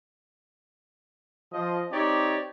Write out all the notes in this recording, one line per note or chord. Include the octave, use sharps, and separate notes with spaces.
F3 D#5
C4 D#4 G4 C#5 D5